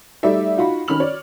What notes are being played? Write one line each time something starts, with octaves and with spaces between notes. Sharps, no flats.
G3 A3 D#4 D5 E5
D#4 F4 F#4 B5
D#3 C#4 B5 F6 F#7
C#5 D5